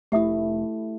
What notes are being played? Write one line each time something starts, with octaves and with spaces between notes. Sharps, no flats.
F1 A3 E4 G4 E5 D#6